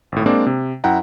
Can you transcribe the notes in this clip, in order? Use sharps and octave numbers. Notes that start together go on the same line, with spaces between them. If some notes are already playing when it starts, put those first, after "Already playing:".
G#1 A2
G#3 A#3 C4 D4 D5 D6
C3
F#2 E4 F#5 G5 A#5